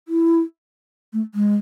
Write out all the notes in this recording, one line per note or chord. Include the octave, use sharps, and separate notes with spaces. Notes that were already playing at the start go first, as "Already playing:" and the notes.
E4
A3
G#3